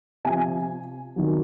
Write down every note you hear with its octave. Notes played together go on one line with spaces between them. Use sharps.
C3 F3 G#5
C3 D#3 F#3